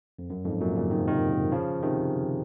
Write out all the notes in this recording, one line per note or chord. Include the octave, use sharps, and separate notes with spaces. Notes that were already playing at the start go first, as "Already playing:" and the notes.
F2
F#2
F2 G#2
F#2 A#2
A#2 C#3
D#3
F3
C3 D#3
C#3 F3
C3 D#3